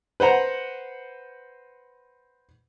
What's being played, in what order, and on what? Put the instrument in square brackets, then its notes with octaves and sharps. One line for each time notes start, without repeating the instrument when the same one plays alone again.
[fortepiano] B4 C5 F#5 A#5